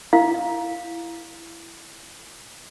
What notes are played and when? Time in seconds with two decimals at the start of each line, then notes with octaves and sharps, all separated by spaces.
0.13 E4 F5